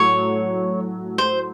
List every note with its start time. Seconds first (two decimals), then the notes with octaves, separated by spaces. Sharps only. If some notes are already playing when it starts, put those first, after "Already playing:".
Already playing: A2 F#3 A3 F#4 C#5
1.18 C5